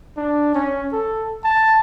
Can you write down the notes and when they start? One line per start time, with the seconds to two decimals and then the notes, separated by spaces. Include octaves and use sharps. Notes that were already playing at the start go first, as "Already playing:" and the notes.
0.17 D4
0.55 C#4
0.93 A4
1.44 A5